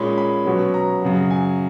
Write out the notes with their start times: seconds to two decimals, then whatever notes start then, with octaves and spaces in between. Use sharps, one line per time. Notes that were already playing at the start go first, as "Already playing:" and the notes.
Already playing: A#2 G#3 C#4 B5
0.18 B5
0.45 B2 F#3 C#4
0.74 A#5
1.02 F#2 C#3 F#3
1.31 G#5